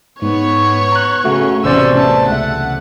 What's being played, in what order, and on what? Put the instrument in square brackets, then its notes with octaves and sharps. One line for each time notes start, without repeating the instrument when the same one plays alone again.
[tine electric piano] G#2 [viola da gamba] B3 [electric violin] C#5 C#6
[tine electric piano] A#5 F#6
[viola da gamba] C#3 [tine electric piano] A3 F#4
[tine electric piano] A1 C5 D5 [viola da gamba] E2 C3 C#4 [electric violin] E6
[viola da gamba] A3 [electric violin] A5
[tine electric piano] C#2 E5 [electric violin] F#5